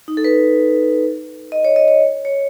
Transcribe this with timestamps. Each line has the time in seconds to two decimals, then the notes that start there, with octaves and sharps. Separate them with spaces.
0.08 D#4
0.17 A4
0.24 B4
1.52 D#5
1.65 C#5
1.76 D#5
1.88 C#5
2.25 C#5